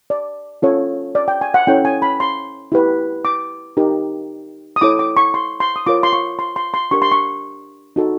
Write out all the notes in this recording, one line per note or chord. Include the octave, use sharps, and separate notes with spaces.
D5
C#4 F4 A4 C#5
D5
G5
G#5
F#5
C#4 E4 A4 C#5 G5
G#5
B5
C6
E4 G4 B4
D6
D#4 G4 A#4
D#6
E4 A4 C#5 D6
D6
C#6
C6
C6
D#6
F4 A#4 C#5 D6
C6
C#6
C6
C6
C6
D4 G4 A#4 C#6
C6
C#6
D#4 F#4 A4